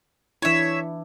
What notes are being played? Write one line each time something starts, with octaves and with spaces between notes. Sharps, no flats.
E3 D4 E4 C#5 E5